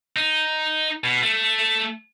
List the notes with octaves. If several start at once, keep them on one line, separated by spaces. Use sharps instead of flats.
D#4
B2
A3